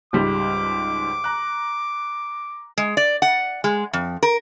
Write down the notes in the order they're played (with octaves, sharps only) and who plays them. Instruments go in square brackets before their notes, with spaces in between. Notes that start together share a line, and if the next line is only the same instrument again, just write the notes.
[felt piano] C#2 G#2 G3 [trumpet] D6
[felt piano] A#5 F#6
[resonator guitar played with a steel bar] G#3
D5
F#5
G#3
F2
A#4